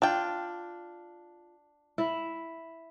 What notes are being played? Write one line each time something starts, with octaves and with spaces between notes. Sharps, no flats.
D4 F4 G5
E4